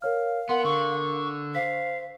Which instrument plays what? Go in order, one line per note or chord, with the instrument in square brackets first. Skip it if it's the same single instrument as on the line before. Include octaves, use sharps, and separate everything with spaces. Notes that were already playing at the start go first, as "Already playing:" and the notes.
[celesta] A#4 C#5 F6 [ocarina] F5
[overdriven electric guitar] B3 [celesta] A#4 C6 [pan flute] F#5
[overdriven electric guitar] D3 [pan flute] C#6
[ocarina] C5 [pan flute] F5 [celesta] B6